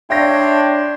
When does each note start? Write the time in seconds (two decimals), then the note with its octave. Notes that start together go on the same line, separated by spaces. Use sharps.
0.10 D4 C#5 E5 G5 C6 A#6